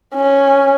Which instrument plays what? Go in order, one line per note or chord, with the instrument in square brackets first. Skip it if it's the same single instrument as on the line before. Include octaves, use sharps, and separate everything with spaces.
[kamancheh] C#4